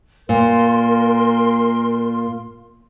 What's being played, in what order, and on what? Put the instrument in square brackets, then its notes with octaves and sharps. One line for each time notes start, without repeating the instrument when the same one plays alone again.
[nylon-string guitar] A#2 [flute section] A#4 C6